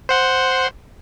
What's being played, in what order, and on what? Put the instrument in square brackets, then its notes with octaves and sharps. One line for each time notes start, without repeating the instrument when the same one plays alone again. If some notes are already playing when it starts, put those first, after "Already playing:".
[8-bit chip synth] C5 F#5 C6